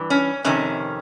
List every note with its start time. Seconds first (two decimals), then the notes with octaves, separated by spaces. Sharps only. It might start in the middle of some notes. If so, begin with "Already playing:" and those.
Already playing: G2 E3
0.10 C#4
0.44 F2 C3 D#3 C#4